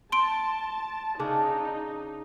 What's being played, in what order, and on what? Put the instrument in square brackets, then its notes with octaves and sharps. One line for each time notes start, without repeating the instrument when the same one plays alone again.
[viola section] A5 [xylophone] C6 D7
[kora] C#3 D4 [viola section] D#4